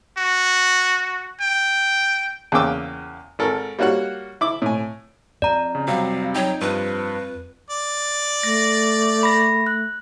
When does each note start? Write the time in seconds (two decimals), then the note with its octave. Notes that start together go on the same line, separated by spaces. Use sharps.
0.18 F#4
1.41 G5
2.52 E2 C#3 A#3 G5 D6 E6
3.39 G#1 A4 A#4
3.79 G3 A#3 F#4 C#5 F#5
4.41 E4 D6
4.62 A2 G#5
5.42 F2 D5 A#5
5.75 C#3
5.88 C3 F#3 G3 F5
6.35 F#3 D#4 G5
6.61 G2 F3 B4
7.70 D5
8.43 A3 A#6
9.23 B5 A#6
9.67 F#6